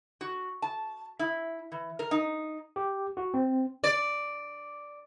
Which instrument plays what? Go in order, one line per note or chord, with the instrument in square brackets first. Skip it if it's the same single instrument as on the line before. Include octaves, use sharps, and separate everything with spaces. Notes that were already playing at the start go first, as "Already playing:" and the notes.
[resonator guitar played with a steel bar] F#4
A5
E4
E3
A#4
D#4
[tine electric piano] G4
F#4
C4
[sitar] D5